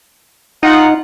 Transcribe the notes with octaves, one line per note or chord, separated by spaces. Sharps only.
D#4 F4 F#5